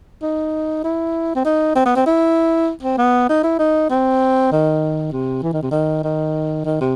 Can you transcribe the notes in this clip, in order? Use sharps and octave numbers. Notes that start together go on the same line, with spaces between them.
D#4
E4
C4
D#4
C4
B3
C4
E4
C4
B3
D#4
E4
D#4
C4
D#3
C3
E3
D#3
C3
D#3
D#3
D#3
C3